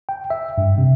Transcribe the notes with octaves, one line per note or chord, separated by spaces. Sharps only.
G5
E5
G2
C3